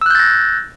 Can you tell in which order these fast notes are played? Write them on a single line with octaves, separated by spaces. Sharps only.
E6 F#6 G6 A6 A#6